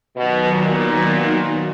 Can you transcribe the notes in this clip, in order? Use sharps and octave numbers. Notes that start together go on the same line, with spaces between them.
B2 D#3 F#3 B3 D#4 F#4
A#2